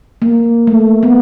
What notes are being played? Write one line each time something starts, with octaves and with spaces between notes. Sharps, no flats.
A#3
A3
B3